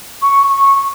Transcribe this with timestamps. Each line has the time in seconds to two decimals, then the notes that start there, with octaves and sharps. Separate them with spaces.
0.22 C#6
0.52 C#6